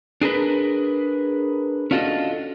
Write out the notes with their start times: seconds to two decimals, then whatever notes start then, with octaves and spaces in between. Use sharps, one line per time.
0.21 D4 G#4 A#4 B4
1.91 C#4 D4 F4 F#4 A4 D#5